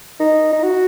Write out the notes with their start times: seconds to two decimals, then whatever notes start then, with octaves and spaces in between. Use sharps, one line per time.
0.20 D#4
0.53 D#4
0.63 F#4